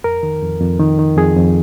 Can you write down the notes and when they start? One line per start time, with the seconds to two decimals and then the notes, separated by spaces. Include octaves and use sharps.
0.04 F2 A#4
0.23 D#3
0.42 F2
0.61 F2
0.80 D#3
0.99 D#3
1.17 F2 G#4
1.36 F2